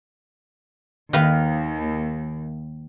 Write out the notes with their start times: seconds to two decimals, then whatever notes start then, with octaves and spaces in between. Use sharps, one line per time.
1.13 D#2 D#3 B4 F5